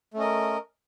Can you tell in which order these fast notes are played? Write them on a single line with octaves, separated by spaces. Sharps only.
A3 C#4 D#5 A#4